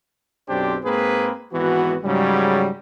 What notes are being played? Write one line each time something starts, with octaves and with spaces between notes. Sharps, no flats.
B1 F#2 C4 D4 G4 C5
G#2 A#3 C4 G#4 B4
G#1 E3 B3 F#4
G#2 C#3 F#3 G3